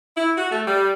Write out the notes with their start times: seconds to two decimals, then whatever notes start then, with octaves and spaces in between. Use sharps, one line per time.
0.16 E4
0.38 F#4
0.51 A3
0.67 G3